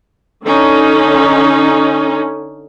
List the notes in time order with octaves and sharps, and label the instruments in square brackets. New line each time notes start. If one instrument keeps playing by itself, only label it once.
[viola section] D3 C#4 D#4